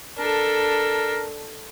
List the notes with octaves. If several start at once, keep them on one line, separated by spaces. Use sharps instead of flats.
D4 A4 A#4